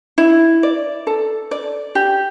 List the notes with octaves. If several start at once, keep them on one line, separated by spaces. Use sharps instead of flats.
E4
D5
A4
D5
G4